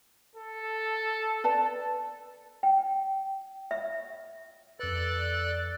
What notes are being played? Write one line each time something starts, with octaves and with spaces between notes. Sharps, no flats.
A4
B4 D5 A5
G5
E5
F2 A4 B4 D5 F#6